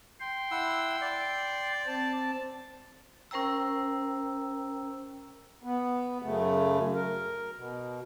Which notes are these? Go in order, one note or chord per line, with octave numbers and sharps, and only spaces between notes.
G5 C6
E4 F#5 E6
D5
C4 A5
C#4 A#4 C5 G5 A#5 E6
B3
F#2 C#3 A3
A#4
B2